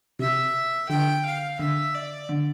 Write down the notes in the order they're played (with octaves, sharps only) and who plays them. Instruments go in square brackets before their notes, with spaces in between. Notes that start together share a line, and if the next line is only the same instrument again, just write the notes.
[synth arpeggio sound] C3 [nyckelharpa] E5
[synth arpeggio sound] D3 [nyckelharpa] G5
[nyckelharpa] F5
[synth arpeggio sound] D3 [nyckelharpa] E5
[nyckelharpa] D5
[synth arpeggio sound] D3